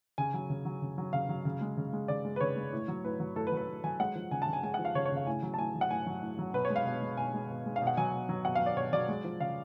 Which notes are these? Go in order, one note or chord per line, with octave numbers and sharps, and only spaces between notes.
C#3 G#5
F#3
C#3
F#3
C#3
F#3
C#3 F5
F#3
C#3
G#3
C#3
G#3
C#3 D5
G#3
B4
C#3 C#5
G#3
A2
F#3
A2 B4
F#3
A2 A4
B4
F#3
B4
A2
F#3 G#5
G#3 F#5
F3
C#3 G#5
A5
C#3
G#5
G#3 G#5
F3 F#5
F5
C#3 C#5
C#5
C#3 F5
A2 G#5
F#3
A5
A2 G#5
F#3
F#5
A2 G#5
F#3
A2
F#3
B2 B4
C#5
G#3
F5
B2
G#3
B2 G#5
G#3
B2
G#3
F5
B2
F#5
F#3 G#5
B2
F#3
B2 F#5
F#3 F5
D5
B2 C#5
F#3 D5
G#3
F3
C#3 F5